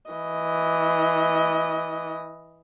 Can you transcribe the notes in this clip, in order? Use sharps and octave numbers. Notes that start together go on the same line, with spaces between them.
E3 D#5